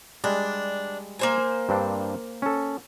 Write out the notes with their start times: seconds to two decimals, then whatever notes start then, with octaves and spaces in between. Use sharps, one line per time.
0.24 G3 G#3 D4
1.19 A#3 C5 G#5
1.69 G2 C4 D4
2.42 C#4 A4